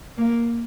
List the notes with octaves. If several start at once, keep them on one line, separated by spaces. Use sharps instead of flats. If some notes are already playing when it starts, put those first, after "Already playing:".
A#3